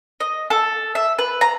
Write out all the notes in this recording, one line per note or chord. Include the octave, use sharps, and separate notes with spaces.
D#5
A4
E5
B4
A#5